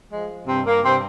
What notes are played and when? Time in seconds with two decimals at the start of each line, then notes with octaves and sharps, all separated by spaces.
0.11 F3 G#3
0.47 G2 C3 C4
0.66 A#3
0.83 G2 C3 C4